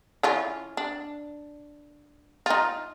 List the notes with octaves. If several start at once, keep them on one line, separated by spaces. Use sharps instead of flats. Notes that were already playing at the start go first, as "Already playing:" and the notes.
E3 C#4 F4
D4
D#4 F4